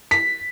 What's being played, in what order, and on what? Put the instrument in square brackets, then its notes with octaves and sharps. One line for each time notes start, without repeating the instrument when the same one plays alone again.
[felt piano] B6